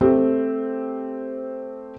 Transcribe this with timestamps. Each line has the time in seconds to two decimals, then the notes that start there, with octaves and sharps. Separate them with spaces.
0.01 A3 C4 G4